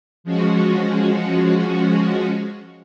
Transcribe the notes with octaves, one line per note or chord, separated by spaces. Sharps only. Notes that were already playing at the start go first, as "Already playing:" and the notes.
F3 G#3 C#4 F#4